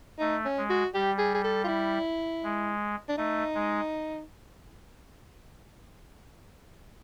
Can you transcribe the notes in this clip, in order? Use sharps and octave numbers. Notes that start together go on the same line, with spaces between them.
A3 D#4
C#4
G#3
F#4
G3 G4
G#4
G#4
A4
F4
E4
G#3
D4
A3 D#4
G#3